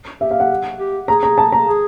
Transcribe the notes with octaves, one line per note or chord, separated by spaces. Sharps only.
G4 E5
F5
F#5
G4
G#4 A#5
A#5
A5
A#5
G#4